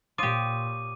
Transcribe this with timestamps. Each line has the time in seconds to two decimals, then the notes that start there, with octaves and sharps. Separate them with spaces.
0.18 A#2 F4 G4 C#5 C6 D6 D#6 D#7